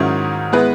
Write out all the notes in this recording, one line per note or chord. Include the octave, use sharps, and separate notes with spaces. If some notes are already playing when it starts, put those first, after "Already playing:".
Already playing: G#2 D#3 F#3 C#4 E4
G#3 B3 E4 B4